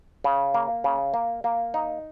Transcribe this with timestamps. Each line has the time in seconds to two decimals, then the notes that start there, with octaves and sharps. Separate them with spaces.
0.24 C#3
0.54 A#3
0.84 C#3
1.14 A#3
1.44 A#3
1.74 D#4